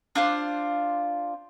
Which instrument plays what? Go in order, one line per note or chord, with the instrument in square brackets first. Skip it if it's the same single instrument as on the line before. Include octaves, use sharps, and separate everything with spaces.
[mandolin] D4 F4 C5